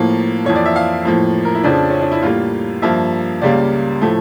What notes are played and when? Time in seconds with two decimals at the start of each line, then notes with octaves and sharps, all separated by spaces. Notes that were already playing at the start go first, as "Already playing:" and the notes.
Already playing: A2 F3 A#3
0.45 F2 E3 A#3 C#5
0.55 D5
0.65 E5
0.76 F5
1.05 A2 F3 A#3
1.45 A#4
1.55 E4
1.64 F2 C#3 F3 D4
1.90 C#4
2.01 D4
2.12 E4
2.23 A2 G3 A#3 F4
2.82 G2 F3 A#3 E5
3.41 C#2 C#3 G3 A#3 D5
4.02 A2 F3 A3